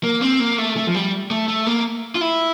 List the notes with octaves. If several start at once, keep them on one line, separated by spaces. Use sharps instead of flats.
A#3
C4
A#3
A3
A3
F3
G3
A3
A3
A#3
F4
E4